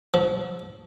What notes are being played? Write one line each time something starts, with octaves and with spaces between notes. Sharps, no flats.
F3